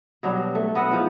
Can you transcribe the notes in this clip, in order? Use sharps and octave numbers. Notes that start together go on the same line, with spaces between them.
B2 F#3 G3 D4
A3
B3 D#5 E5 F#5
G#2 F3